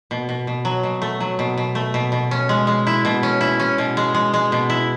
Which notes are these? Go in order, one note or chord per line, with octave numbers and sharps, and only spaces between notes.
B2
B2
B2
F#3
B2
A3
F#3
B2
B2
A3
B2
B2
C#4
G#3
G#3
E4
B2
C#4
E4
C#4
B2
G#3
G#3
G#3
B2
E4